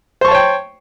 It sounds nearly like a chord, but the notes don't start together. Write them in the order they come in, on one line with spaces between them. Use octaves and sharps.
C5 C#6 A5 C#5 G5